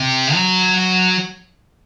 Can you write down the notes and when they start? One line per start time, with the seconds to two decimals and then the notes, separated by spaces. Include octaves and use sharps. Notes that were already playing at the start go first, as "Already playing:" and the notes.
Already playing: C3
0.34 F#3